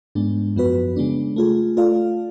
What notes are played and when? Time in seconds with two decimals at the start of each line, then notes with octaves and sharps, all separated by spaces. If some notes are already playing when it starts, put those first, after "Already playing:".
0.15 G#2 G#3 B3 D4
0.56 F#2 F3 B3 F#4 B4
0.96 C#3 G#3 B3 D4
1.36 A3 F4 G#4
1.77 A3 F4 A4 D5 F5